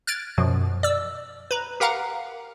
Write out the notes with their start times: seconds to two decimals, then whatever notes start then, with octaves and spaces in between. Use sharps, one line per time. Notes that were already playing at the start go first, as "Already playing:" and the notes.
0.07 F6 F#6 G#6 A6 D7
0.38 F#2 B2 F3
0.83 D5 E6
1.51 B4 A#5
1.80 G4 A#4 F5 F#5 A#5